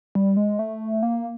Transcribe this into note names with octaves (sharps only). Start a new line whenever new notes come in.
G3
G#3
A3
A#3